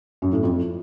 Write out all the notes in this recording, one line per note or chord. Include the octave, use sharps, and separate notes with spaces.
F#2
A2
F2